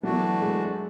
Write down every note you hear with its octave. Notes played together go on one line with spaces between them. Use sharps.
E3 F#3 A3 D4 F#4
G#3